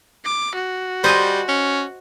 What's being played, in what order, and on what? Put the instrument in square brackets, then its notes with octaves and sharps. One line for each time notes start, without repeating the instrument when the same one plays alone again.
[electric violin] D6
F#4
[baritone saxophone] G3 [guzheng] C5 D#5 G#5
[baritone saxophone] C#4